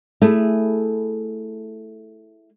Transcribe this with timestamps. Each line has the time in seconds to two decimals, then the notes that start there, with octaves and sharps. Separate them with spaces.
0.22 A3 E4 G#4